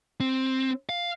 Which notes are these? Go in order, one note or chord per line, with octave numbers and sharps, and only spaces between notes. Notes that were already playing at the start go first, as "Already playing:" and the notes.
C4
F5